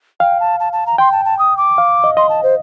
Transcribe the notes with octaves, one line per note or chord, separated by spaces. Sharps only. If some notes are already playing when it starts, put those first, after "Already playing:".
F5 G5
A5
A5
A5
A#5
G5 C6
A5
A5
D#6
D6
F5
D#5
D#5 C6
A5
C5